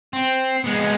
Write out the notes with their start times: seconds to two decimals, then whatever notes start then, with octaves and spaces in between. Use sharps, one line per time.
0.13 C4
0.64 G#3 B3